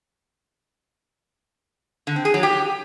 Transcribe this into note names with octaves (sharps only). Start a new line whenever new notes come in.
D3
C4
G#4
F#3
G4